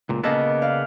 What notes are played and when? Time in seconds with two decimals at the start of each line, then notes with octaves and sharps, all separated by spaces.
0.09 C#2 A#2
0.23 C#3 A#3 B3 A4 D#5
0.62 D5 F5